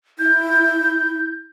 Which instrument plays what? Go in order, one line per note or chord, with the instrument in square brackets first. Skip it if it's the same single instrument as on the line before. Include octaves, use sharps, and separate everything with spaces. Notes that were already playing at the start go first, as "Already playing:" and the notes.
[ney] E4 [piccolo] G6